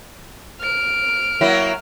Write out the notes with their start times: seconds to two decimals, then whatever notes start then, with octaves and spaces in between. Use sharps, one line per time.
0.60 F6 D7
1.41 F#3 A#3 E4